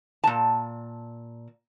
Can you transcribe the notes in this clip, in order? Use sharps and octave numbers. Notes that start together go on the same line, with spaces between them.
A#2 A5